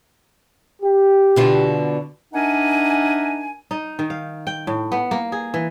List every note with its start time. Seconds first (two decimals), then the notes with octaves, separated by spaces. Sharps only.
0.82 G4
1.36 B2 D3 F4
2.34 D4 D#4 A#4 E5 F#5 G#5
3.71 D#4
3.99 D#3
4.10 F5
4.47 G5
4.67 A2
4.92 B3
5.11 A#3
5.32 G#4
5.54 E3